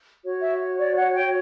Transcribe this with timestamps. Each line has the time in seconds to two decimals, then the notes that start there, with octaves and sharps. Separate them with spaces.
0.23 F#4 C#5
0.41 E5
0.78 D5
0.96 F#5
1.14 G5